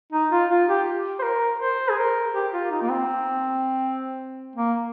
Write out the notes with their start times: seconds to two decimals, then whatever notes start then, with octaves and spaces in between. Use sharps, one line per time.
0.13 D#4
0.32 F4
0.50 F4
0.69 G4
1.19 C5
1.23 A#4
1.60 C5
1.89 G#4
1.98 A#4
2.34 G4
2.53 F4
2.71 D#4
2.82 A#3
2.90 C4
4.56 A#3